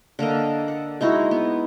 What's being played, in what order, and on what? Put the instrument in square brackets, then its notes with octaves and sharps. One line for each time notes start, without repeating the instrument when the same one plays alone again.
[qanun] D3 A#3 A#4 D#5
F#5
G#3 D#4 E4 F#4
B3